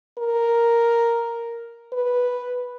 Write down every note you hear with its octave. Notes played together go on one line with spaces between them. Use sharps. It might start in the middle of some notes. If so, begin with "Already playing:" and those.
A#4
B4